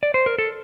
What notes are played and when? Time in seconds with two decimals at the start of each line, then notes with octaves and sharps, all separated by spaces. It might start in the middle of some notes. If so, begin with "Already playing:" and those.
0.03 D5
0.14 C5
0.26 A#4
0.38 A4